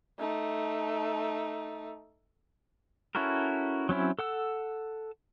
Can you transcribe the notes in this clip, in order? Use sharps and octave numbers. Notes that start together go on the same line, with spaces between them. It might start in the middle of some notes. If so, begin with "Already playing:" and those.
A3 D#4
C#4 E4 F#4 A4 A#4
F#3 C4 C#4 E4
A4 F#5 E6